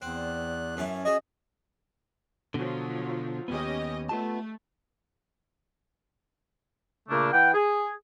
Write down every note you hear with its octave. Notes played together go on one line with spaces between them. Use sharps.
E2 C4 F#6
D5
F#2 E3 C#4 A5
F#4 G#4 C#5 D#5
B2 D3 F3 F#3
D#2 G#2 B3 C#4 G4 D#5
A3 B3 F4 A5
A#2 C#3 A3 A#3 D4
E3 F#5 G5
G#4